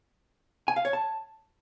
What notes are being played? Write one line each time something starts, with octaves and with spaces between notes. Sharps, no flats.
G#5
F5
C#5
A5